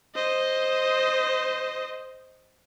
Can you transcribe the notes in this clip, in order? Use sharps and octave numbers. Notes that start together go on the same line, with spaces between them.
C5 D#5